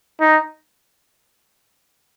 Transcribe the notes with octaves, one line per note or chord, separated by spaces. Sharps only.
D#4